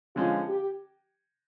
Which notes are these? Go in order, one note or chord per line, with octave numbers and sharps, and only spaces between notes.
D3 F3 G#3 C#4 F4
G4